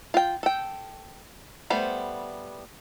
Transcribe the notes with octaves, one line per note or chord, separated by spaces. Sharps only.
F4 G5
A4 G5
G3 A3 B3 C5